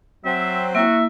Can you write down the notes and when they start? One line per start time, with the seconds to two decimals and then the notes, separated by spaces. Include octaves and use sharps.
0.25 F#3 C4 E5
0.75 A#3 E4 F#4 E5